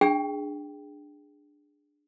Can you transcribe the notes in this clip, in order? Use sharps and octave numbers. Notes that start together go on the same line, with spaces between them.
D4 G#4 G5